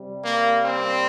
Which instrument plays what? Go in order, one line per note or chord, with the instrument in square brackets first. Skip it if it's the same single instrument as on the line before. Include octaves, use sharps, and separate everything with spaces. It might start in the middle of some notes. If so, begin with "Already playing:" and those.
Already playing: [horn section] C3 G3
A#3
C4